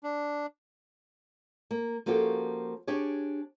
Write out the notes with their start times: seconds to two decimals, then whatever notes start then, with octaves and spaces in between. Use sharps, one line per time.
0.03 D4
1.71 A#3
2.06 F3 A#3 C#4 F#4 G4 A4
2.87 D4 G4 G#4 C#5